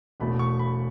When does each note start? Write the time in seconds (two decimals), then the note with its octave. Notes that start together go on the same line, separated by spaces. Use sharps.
0.20 E1 E2 B2 A3 B5
0.39 C#6
0.59 B5